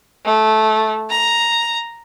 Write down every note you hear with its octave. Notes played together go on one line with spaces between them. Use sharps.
A3
A#5